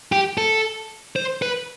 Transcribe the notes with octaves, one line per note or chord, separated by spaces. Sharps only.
G4
A4
C5
B4